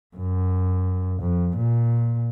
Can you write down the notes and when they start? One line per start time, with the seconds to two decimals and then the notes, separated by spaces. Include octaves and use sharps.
0.16 F#2
1.21 F2
1.56 A#2